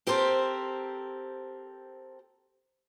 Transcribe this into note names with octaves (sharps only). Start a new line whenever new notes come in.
C4 G4 A4 A#4 C5